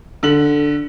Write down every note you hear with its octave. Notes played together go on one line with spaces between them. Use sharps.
D3 F#7